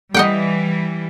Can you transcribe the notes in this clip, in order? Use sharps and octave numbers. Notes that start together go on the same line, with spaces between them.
E3 G3 D#5 F#5 G5